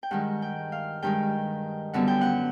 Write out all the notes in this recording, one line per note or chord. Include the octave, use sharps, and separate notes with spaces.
G5
G2 D#3 G#3 F#5
G5
F5
G2 D#3 G#3 G5
F#2 D3 G3 B3 F#5
G5
F#5